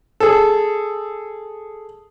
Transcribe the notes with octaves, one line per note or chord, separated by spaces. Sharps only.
G#4 A4